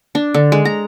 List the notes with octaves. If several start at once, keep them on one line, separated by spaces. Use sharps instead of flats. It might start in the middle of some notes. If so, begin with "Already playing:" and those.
D4
D3
G#3
A#5